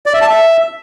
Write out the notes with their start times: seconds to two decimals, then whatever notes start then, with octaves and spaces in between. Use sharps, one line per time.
0.06 D5
0.14 E5
0.21 A5
0.29 E5